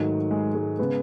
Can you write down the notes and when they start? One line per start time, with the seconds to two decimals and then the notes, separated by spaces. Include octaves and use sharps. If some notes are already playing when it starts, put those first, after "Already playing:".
Already playing: G#2 D#3 F#3 A3
0.31 G#3 G#4
0.55 G#3 G#4
0.79 C#3 G#3 B3 B4